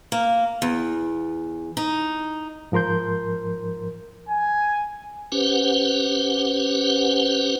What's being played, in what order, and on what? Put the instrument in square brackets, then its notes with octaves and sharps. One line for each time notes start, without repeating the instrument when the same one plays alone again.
[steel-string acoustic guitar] A#3
E2
D#4
[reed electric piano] G#2 F3 A#4 C6 G6
[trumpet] G#5
[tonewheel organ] C#4 G4 B4 C5 F#5